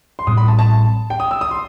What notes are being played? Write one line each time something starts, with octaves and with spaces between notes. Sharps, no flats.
C6
A1 A2 G3 C4 D#6
B5
A5
A5
G5
D#6
E6
D#6
C6